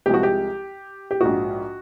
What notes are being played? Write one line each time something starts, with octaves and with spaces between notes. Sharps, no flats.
C2 C3 F3 G#3 G4
F#4
G4
G4
A#1 G#2 F3 F#4